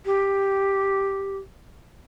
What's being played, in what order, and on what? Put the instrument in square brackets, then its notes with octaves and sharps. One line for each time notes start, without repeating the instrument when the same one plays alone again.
[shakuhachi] G4